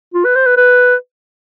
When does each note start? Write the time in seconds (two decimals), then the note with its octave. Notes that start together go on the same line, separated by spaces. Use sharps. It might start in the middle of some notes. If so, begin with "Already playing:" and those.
0.14 F4
0.25 B4
0.35 C5
0.46 B4
0.57 B4